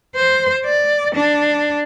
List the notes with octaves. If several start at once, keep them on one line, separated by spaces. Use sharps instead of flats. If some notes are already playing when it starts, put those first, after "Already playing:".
C5
D5
D4